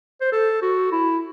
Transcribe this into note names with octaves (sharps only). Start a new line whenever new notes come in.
C5
A4
F#4
E4